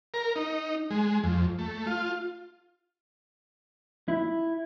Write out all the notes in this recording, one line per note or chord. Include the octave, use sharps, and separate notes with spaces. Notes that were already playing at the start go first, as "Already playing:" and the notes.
A#4
D#4
G#3
F2
A3
F4
E4